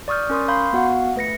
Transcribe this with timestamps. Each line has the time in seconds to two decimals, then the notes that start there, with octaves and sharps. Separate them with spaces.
0.08 D5 C#6 D#6 F6 G6
0.30 C#4 A#4 C6 C#6 D#6
0.48 F5 B5 C6 G6
0.73 B3 F#4 F5 F#5
1.16 A3 B4 A#6 C#7